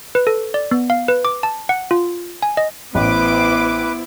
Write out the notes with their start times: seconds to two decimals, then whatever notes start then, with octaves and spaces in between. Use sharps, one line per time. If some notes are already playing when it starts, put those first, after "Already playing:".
0.15 B4
0.27 A4
0.54 D5
0.71 B3
0.90 F5
1.08 B4
1.25 D6
1.43 A5
1.69 F#5
1.91 F4
2.43 G#5
2.57 D#5
2.95 A1 B3 E4 B4 C5 D6